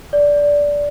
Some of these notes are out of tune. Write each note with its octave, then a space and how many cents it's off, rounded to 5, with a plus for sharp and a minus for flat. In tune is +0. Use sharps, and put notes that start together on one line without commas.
D5 -10